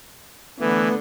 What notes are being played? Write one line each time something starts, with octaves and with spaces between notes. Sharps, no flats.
D3 E3 A3 B3